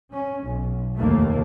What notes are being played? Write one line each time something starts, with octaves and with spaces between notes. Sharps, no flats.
C#4
B1
F1 D#2 A3 A#3